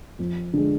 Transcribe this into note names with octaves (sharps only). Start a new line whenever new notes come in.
F2
D3 G#3